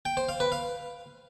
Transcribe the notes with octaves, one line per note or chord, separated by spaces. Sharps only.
G5
C5
F5
B4
F5